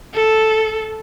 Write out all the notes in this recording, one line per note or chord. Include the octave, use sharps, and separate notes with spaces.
A4